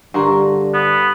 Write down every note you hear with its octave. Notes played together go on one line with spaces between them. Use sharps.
G2 D3 F4 F#4 A#4
B3